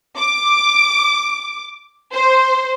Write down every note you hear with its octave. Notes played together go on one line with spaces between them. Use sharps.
D6
C5